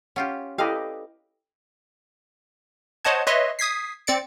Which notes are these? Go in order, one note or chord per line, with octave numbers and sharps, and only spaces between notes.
C#4 F4 G4 F#5
E4 G4 A4 B4 D#5 F5 G5
C5 C#5 D#5 F#5 A5 G#6
B4 C#5 D#5 E5 C6
D#6 G#6 B6 C7
C4 D5 A6 C#7 D7